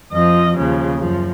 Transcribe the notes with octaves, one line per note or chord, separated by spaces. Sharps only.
F2 F3 D#5
D#2 C#3 F3
F#2 F3